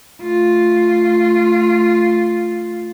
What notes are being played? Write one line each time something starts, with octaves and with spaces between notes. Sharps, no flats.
A3 F4